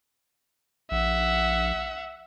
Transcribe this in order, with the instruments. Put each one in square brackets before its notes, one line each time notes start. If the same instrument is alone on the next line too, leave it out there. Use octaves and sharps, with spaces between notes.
[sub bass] A#1 [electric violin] E5 F#5